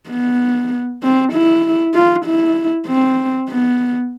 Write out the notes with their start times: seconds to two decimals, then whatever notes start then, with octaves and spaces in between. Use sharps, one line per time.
0.09 B3
1.03 C4
1.33 E4
1.94 F4
2.25 E4
2.87 C4
3.49 B3